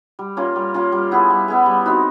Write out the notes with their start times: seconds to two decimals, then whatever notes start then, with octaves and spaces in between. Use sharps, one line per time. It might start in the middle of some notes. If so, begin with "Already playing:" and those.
0.19 G3
0.37 A#3 C#4 F4
0.56 G3
0.74 A#3 C#4 F4
0.92 G3
1.11 B3 E4 G#4
1.30 G3
1.48 B3 E4 G#4
1.66 G3
1.86 C4 D#4 F#4